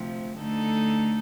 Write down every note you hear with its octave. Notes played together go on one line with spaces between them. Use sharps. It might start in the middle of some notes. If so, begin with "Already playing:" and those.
Already playing: D2 C3 F3
D2 D3 A3 D#4 A4